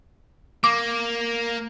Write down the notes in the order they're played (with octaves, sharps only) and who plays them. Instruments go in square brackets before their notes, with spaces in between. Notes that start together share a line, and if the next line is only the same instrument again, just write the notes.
[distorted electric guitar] A#3 [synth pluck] D6